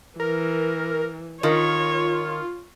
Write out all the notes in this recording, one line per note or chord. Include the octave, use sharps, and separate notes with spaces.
E3 A#4
D#3 F4 C#5